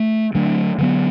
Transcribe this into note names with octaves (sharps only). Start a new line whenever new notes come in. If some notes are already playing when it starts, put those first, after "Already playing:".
Already playing: A3
D3 F#3 A3 D4
D3 F#3 B3